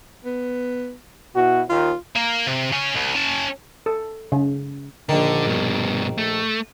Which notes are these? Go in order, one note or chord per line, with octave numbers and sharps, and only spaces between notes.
B3
B2 E4 F#4
D#2 F4
A#3
C3
C#3 C#4
C2
C#4 A5
A4
C#3
A#1 D3 D#3
G2 B2
A3